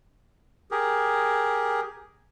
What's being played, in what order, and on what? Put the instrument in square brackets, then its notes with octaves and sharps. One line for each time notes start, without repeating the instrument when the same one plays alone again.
[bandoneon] G4 G#4 A#4